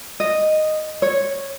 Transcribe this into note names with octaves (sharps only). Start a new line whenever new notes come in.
D#5
C#5